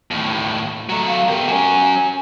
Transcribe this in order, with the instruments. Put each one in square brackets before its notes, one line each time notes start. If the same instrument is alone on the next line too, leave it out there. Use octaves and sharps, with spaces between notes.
[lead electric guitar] D#2 A2
[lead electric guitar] F#3 A3 [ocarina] A#5
[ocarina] F5
[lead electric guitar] B3 G4 [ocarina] A#4
[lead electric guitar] F#3 C#4 [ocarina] G#5